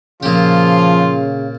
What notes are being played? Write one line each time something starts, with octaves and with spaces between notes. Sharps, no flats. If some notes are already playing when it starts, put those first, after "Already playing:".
A#2 C#3 F3 F4 G4